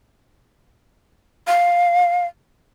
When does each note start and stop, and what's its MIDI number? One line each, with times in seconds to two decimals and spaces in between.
1.47 2.26 77